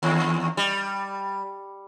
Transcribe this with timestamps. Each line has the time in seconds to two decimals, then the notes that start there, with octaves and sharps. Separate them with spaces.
0.03 D#2
0.57 G3